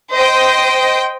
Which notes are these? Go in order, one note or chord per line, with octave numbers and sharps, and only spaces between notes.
C5 D#5 G5